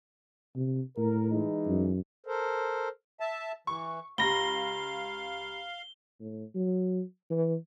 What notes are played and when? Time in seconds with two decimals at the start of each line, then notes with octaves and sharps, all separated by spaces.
0.56 C3
0.97 A2 A#4
1.31 E3 G#3 D#4
1.67 F#2
2.26 A4 A#4 C5
3.20 E5 A5
3.67 E3 C#6
4.18 C#2 G4 F5 A#5 B5 A#6 G7
6.20 A2
6.55 F#3
7.31 E3